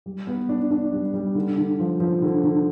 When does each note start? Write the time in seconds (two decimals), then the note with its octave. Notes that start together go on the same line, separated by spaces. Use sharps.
0.06 G3
0.27 B3
0.49 D4
0.71 D4
0.92 G3
1.14 G3
1.35 D3
1.57 D3
1.79 F3
2.00 F3
2.22 D3
2.43 D3